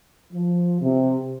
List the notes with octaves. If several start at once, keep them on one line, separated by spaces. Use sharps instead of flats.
F3
C3